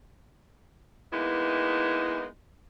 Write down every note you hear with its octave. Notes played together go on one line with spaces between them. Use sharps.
E3 G#3 A#3 B3 D#4 E4